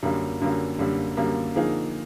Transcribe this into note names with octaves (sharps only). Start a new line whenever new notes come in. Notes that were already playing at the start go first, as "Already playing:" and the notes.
F#2 D3 G3 A#3
F#2 D3 G3 A#3
F#2 D3 G3 A#3
F#2 D3 G3 A#3
D3 F3 A#3 D#4 G#4